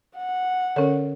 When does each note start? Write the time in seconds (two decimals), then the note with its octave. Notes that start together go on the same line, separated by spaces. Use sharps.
0.17 F#5
0.76 D3 C#4 A4 A#4 C#5